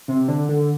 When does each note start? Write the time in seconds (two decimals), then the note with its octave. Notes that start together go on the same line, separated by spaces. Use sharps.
0.08 C3
0.28 D3
0.49 D3